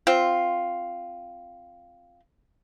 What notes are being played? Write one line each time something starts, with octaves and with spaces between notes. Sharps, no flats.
C4 F4